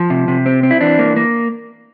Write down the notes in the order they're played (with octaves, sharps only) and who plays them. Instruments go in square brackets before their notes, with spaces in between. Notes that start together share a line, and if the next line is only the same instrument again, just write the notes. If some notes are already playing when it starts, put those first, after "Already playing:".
Already playing: [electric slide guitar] F3
C3
C3
C4
C4
E4
E3 D4
A#3
A#3